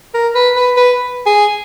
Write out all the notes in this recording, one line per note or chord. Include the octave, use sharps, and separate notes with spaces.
A#4
B4
B4
B4
G#4